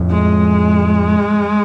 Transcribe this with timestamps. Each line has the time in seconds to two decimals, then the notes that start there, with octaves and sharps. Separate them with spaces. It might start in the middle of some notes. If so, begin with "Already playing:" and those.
Already playing: F2 A2
0.10 G#3